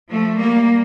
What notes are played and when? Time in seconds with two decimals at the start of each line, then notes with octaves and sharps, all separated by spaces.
0.11 F3 A3
0.39 G3 A#3